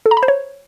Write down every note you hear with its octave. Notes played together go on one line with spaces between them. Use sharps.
A4
A#5
B5
C5
C#5